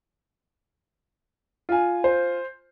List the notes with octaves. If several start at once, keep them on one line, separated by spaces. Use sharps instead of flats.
F4 G#5
C5